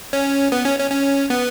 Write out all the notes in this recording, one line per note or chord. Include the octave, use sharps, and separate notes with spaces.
C#4
B3
C#4
C#4
C#4
B3